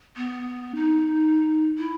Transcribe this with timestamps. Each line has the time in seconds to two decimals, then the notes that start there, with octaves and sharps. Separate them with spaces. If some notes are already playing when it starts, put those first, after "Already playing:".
0.17 B3
0.75 D#4
1.78 E4